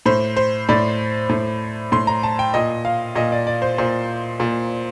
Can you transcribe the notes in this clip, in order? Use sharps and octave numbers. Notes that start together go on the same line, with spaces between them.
A2 C5
C5
A2 D5
A2
A2 C6
A#5
A5
G5
A#2 D#5
F5
A#2 D#5
D5
D5
C5
A#2 C5
A#2